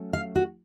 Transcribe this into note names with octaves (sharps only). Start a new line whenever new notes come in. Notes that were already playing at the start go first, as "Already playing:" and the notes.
Already playing: F#3 A3 C#4
F5
F#4